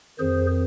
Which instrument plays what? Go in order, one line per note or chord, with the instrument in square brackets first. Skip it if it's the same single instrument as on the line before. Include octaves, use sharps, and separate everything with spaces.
[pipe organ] F2 D#3 G#4 C5